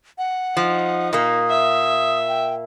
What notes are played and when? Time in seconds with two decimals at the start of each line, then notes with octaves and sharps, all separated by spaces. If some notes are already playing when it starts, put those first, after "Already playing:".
0.18 F#5
0.57 F3 D#4
1.13 A#2 A#3 D#6
1.50 E5
2.29 G5